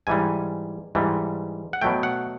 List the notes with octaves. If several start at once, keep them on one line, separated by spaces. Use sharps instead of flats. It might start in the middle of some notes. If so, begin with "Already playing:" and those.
G#2 E3 G3 G#5
G#2 E3 G3
F#5
B2 F#3 A3 G5
F#5